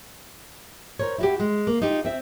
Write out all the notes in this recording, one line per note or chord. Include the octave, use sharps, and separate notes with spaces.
A#4 C5 C#5
E4 F#4 G4
G#3
A#3
D#4 F4 G4
C4 E5